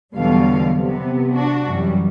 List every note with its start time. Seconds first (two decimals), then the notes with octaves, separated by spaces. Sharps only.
0.16 E2 B2 D3 F#3 G3 F5
0.77 C3 B3
1.35 D4 F#4
1.69 F#2 E3 G3